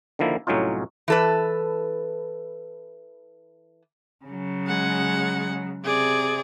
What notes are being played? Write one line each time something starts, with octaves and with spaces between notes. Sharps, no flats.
D3 D#3 F3 A#3 E4
C2 A2 F#3 C#4 D#4 F4
E3 A4 B4
C#3 F#3
G#3 F#5
C3 G#4 D5